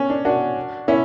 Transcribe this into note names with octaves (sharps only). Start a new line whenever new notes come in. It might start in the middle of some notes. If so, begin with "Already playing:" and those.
Already playing: C#4
D4
D4 F#4
C#4 E4